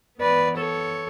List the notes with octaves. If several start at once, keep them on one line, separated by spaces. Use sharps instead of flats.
E3 B3 B4 D5
A4 C#5